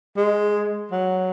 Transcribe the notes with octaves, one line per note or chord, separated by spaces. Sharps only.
G#3
F#3